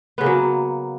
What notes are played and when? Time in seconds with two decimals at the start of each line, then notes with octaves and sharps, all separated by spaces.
0.18 B3
0.21 C#3
0.23 A#3
0.26 F#3